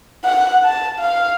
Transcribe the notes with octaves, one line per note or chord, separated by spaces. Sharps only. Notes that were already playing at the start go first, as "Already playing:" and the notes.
F#5
A5
F5